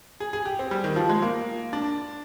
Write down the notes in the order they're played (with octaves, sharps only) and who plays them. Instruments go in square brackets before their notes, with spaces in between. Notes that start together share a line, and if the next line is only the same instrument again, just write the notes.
[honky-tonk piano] G#4
G#4
G4
C4
G3
D#3
F3
G#3
A#3
D4